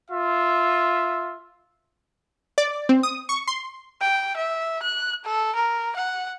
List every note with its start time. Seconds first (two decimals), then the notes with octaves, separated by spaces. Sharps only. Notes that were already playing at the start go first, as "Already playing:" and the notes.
0.10 F4 E5
2.58 D5
2.89 C4
3.03 D#6
3.29 C#6
3.47 C6
4.01 G5
4.37 E5
4.83 F#6
5.25 A4
5.55 A#4
5.96 F#5